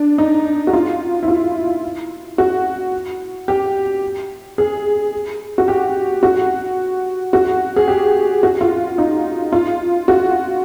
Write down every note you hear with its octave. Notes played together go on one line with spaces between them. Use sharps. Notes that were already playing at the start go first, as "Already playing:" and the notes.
Already playing: D4
D#4
F#4
F4
E4
F4
F#4
G4
G#4
F#4
G4
F#4
F#4
G#4
G4
F#4
F4
D#4
F4
F#4